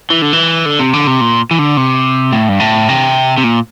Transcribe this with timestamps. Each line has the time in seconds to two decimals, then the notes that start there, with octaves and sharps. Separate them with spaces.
0.10 E3
0.22 D3
0.33 E3
0.66 D3
0.79 C3
0.93 D3
1.07 C3
1.21 A#2
1.51 E3
1.59 D3
1.77 C3
2.32 A2
2.49 G2
2.60 A2
2.89 C3
3.38 C3
3.44 A#2